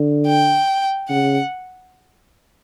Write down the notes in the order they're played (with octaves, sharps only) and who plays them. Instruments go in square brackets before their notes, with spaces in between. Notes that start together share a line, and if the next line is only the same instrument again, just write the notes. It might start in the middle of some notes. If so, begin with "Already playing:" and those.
Already playing: [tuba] D3
[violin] G5
[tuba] C#3 [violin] F#5